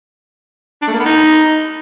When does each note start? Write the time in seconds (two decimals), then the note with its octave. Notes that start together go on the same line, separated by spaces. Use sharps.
0.82 D4
0.88 A3
0.94 A#3
1.00 B3
1.06 D#4